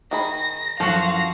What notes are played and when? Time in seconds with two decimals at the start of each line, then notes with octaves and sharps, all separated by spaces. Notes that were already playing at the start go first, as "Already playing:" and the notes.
0.11 D#3 G#4 B5 A#6
0.80 F#2 E3 F3 F#4 A4 F5 A#6